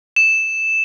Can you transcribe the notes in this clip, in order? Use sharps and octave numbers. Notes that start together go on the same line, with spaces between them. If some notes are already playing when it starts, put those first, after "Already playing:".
E7